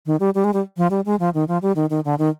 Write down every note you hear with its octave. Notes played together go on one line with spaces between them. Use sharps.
D#3
G3
G3
G#3
G3
F3
G3
G#3
F3
D#3
F3
G3
D#3
D#3
D3
D#3